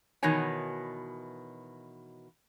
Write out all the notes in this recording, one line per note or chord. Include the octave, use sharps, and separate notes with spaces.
B2 D#3 E3 C#5 G#5